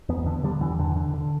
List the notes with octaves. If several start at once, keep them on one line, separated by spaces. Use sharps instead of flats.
E2 B3
D3 B3
D3 G3
E2 E3
E2 D3
D3
D3